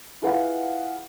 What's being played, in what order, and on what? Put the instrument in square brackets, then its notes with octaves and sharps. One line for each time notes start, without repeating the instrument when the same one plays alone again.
[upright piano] E4 F4 G#4 B4 F5 F#5